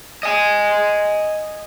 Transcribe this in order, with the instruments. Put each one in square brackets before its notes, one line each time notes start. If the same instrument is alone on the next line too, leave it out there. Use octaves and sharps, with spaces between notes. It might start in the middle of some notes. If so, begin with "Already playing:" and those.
[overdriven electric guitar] D#5 G#5